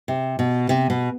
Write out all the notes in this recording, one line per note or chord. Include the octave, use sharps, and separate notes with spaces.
C3
B2
C3
B2